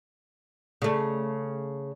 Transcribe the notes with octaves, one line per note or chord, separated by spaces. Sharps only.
C#3 A3